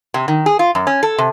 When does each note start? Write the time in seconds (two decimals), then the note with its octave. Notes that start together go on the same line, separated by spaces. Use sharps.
0.14 C3
0.28 D#3
0.46 G#4
0.59 F4
0.75 F#2
0.87 C#4
1.03 A4
1.18 C3